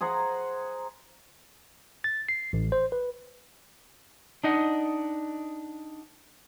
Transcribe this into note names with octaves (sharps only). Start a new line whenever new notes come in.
G#4 C5 F#5 A#5
A6
C7
A1
C5
B4
D4 D#4 D#5 F#5